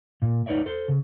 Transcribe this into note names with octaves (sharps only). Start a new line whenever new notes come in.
A#2
D#4 B4 C#5 D5 E5
A4 C5
C#3